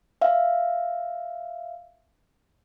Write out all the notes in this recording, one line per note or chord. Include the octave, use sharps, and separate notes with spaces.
E5 F5